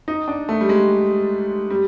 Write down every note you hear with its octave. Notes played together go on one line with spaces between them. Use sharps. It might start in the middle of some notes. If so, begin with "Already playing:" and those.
D#4
D4
A3
G3
G#3
G3